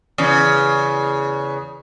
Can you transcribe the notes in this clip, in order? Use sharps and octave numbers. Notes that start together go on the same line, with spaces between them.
E2 C#3